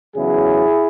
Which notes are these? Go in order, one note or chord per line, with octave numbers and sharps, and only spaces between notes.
E2 C#3 F#3 E4 G#4